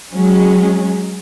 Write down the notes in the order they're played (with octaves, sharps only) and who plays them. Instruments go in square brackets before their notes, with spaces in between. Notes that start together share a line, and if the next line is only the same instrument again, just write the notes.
[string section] F#3 G#3 C#4